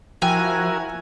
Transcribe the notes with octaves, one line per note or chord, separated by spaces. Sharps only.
F3 E4 F#4 A#4 G5 G#5 A#5